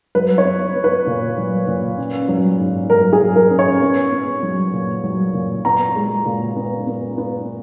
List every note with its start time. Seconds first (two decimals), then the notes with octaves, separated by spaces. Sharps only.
0.15 F#3 B4
0.38 C#5
0.45 B3
0.75 B3
0.84 B4
1.07 A#2
1.38 F#3
1.68 A#2
1.98 C#4
2.28 F#3
2.59 G#2
2.90 F#3 A#4
3.13 G#4
3.21 F#3
3.36 A#4
3.51 C#4
3.59 C#5
3.82 B3
4.12 B3
4.43 F#3
4.73 A#2
5.04 F#3
5.34 A#2
5.65 B3 A#5
5.96 G#3
6.25 A#2
6.57 B3
6.87 B3
7.18 B3